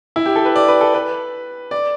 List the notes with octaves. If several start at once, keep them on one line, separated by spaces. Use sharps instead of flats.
E4
G4
A4
B4
D5
B4
A4
B4
D5